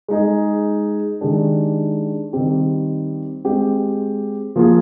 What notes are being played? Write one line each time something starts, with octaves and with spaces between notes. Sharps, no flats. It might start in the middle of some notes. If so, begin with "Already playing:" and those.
G#3 D#4 G#4
D#3 G#3 D4 G4
D#3 G3 C4 G4
G#3 C4 G4
F3 A#3 F4 G#4